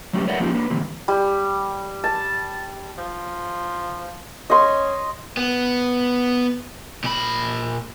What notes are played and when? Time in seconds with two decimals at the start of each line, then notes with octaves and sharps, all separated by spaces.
0.13 F#3 A3 B3 C#4 G4 B4
0.27 A#4 B4 C#5 D5 E5 F#5
0.39 F3 A#3 C#4 D#4 F4 G4
0.53 A#3 D4 B4
0.70 A#2 D3 E3 G3 A#3 C4
1.08 G3
2.04 A5
2.98 F3
4.50 C#4 D#5 C6
5.37 B3
7.04 A#2 B5